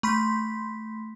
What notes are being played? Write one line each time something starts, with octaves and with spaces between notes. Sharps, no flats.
A3 B5 C6 B6